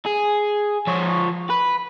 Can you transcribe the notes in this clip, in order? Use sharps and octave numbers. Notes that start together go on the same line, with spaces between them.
G#4
F3 C#5
B4